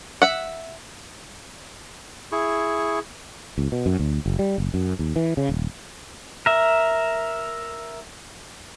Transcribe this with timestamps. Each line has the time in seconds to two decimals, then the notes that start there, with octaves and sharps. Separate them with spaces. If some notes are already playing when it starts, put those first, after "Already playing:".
0.22 E5 F#5
2.32 E4 G#4 C#6
3.58 C#2
3.72 B2
3.86 F#2
3.99 D2
4.26 F#1
4.39 G3
4.58 F#1
4.74 F#2
4.99 D#2
5.16 E3
5.37 C#3
5.49 D#1
6.46 A#4 E5